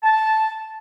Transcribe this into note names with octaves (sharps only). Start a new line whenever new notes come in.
A5